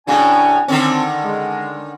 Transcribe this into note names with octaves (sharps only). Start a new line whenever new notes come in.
A2 C#3 F#3 D4 G#5
D3 D#3 C4 C#4
G#3